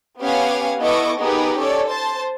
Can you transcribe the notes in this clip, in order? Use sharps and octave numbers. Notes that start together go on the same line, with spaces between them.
B3 C#4 G4 F5 F#5 G#5
B3 E4 A4 D#5 C#6 D6
B3 D#4 G4 G#4 A#4 B4
C#4 A4 C#5 D5
C5 A5